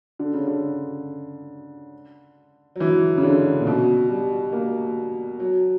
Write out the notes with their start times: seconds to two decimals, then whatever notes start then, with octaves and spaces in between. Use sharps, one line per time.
0.19 D3
0.34 C#3
0.47 D3
2.76 F#3
2.80 E3
3.17 C#3
3.23 D3
3.61 A#2
3.67 B2
4.10 G3
4.53 A#3
5.40 F#3